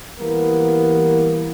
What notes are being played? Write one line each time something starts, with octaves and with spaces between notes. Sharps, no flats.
E3 G3 A#3 B3 A#4